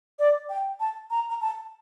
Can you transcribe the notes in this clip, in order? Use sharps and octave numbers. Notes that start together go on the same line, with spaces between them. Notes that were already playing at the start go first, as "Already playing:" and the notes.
D5
G5
A5
A#5
A#5
A5